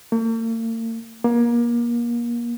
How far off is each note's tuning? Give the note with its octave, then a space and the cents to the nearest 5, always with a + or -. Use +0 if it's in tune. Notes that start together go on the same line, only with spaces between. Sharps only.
A#3 -45
A#3 +30